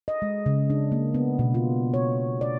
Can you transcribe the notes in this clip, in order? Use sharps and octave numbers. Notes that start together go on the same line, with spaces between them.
D#5
G#3
C#3
D4
A#3
B3
B2
F4
C#5
D5